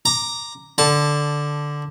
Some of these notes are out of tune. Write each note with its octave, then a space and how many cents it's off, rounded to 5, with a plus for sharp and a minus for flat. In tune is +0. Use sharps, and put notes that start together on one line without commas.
A#5 +0 D6 +0
D3 +0 A5 -5